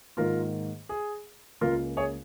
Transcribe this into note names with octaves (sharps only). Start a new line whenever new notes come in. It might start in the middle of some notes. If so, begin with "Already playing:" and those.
G#2 D#3 A#3 F4 A#4
G#4
C#2 C#3 A#3 F4 A#4
G#4 C#5